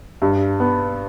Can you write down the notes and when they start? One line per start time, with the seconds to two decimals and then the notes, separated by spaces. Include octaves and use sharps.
0.22 G2
0.60 B3